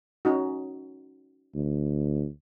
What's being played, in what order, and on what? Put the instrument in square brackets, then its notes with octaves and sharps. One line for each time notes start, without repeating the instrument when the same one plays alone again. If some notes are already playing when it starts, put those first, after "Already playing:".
[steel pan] C#4 D#4 F#4
[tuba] D2